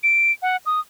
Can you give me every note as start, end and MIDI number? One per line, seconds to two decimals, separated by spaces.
0.03 0.32 98
0.42 0.57 78
0.66 0.80 87